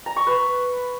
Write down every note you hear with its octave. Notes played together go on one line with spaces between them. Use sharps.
A#5
C#6
B4